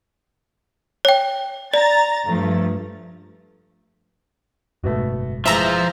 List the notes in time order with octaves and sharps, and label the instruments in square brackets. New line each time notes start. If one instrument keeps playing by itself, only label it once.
[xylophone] C#5 G5
[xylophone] D5 [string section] A#5 A6
[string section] G2 F3 A3
[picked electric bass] F#1 G#2 B2 [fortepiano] A3 B3 F#4
[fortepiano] E3 G#3 [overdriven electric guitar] F3 [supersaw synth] E5 A#5